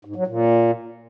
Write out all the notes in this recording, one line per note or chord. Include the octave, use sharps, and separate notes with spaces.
G#2
F#3
A#2